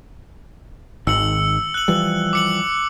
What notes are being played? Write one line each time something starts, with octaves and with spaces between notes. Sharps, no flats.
G#1 D#3 E6 C#7 F#7
F#6 F#7
E3 F3 G3
D6 C#7 F#7